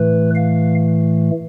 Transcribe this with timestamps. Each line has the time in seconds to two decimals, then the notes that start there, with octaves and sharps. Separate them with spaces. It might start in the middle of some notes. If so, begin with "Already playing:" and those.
Already playing: A2 E3 A3 B4
0.35 F5